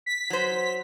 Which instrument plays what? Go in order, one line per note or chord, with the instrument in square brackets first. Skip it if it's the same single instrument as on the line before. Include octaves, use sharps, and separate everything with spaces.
[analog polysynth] B6
[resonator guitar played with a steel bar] F#3 C5